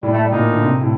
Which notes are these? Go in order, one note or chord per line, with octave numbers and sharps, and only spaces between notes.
A2 G3
A3
G3
A#2 D#4
D3
C3
A2